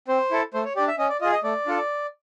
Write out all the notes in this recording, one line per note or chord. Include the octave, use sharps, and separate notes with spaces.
C4 C5
E4 A4
A3 C5
C#5
D4 G4 D5
E5
C#4 D#5
D5
F4 G#4 D#5
D#5
A3 D5
D4 F4 A4